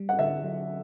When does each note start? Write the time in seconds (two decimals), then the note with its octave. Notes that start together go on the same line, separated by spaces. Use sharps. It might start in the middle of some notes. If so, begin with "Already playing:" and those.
Already playing: G3
0.09 F#5
0.19 D3 E5
0.44 F#3